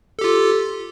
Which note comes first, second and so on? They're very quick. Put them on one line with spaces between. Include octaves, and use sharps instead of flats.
A4 G4 F4